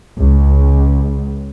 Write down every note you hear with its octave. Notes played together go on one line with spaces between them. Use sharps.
C#2